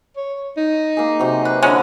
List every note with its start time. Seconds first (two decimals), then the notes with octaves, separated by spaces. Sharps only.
0.17 C#5
0.57 D#4
0.97 A#3 G#4
1.19 C3 F#3
1.45 B4
1.62 D3 G#3 C#4 E4 F4